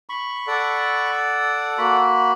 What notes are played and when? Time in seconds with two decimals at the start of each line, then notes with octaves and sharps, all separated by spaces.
0.09 B5 C#6
0.47 A4 D5 F#5
1.78 A#3 F#4 B5